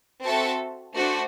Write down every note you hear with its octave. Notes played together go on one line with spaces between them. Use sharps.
C4 F#4 A4 E5 A5
A3 D4 F#4 C5